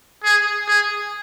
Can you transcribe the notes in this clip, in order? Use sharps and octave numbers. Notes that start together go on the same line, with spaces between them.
G#4
G#4